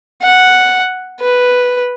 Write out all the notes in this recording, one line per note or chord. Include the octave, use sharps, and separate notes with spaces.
F#5
B4